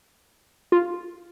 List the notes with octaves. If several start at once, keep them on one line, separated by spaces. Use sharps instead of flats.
F4